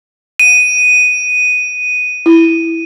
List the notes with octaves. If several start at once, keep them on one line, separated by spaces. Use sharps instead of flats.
D#7
E4